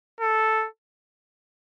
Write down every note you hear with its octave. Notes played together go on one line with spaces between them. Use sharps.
A4